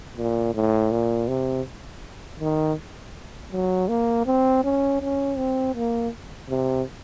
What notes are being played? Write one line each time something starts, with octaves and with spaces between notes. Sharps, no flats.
A#2
A2
A#2
C3
D#3
F#3
A#3
C4
C#4
C#4
C4
A#3
C3